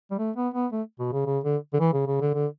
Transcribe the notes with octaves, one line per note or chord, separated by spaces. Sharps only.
G3
A3
B3
B3
A3
B2
C#3
C#3
D3
D3
E3
C#3
C#3
D3
D3